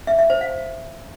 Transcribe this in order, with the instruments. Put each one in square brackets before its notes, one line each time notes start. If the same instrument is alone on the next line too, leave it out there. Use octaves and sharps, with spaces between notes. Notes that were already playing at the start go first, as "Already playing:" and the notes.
[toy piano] E5
E5
C5
F5